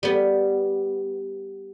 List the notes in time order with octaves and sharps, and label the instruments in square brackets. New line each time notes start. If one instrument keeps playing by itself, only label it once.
[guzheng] G3 B3